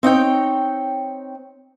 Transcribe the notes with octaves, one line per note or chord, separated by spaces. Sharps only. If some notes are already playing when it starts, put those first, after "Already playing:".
C4 D#4 C#5 G5